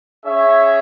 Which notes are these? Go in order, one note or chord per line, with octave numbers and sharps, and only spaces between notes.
C#4 G#4 C#5 E5